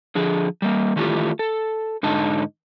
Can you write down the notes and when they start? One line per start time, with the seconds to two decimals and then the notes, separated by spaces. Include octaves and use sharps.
0.15 D3 F3 G#4
0.62 G3 A#3
0.96 D#3 E3 A3 F4 G4
1.39 A4
2.03 G#2 D3 D#4 A5